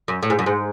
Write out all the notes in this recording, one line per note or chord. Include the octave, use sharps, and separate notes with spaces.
F#2
A2
G#2
F#2
G#2